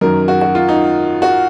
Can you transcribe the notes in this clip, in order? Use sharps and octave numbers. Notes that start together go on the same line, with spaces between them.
F#2 D#3 F#3 A#4
F#4
F#4
F4
D#4
F#4